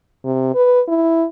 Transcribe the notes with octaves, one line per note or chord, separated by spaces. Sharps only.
C3
B4
E4